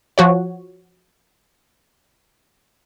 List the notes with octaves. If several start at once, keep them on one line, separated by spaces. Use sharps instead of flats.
F3 F#4 C#5